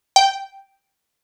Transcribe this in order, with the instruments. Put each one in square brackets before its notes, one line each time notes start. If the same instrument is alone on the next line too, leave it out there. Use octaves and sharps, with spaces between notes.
[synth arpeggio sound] G5